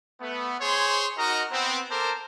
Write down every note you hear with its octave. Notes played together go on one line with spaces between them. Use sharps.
A3 B3
G#4 C5 C#5 C6
D#4 F#4 A#4 D#5 A#5
B3 C4
A4 A#4 C5 A5 D6